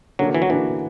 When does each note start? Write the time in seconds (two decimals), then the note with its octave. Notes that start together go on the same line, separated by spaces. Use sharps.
0.19 D3 F#3 A#3 D4 F#4
0.35 E3
0.42 F#3
0.49 D3 E3 A#3 D4 F#4